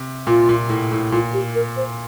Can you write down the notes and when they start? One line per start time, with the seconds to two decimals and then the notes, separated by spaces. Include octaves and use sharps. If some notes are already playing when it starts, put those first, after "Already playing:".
Already playing: C3
0.27 A#2 F4
0.49 A#2
0.69 A2
0.92 A2
1.12 A#2 F4
1.33 G4
1.55 A#4
1.76 C5